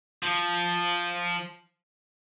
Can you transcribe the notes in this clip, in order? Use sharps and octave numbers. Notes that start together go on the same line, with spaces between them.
F3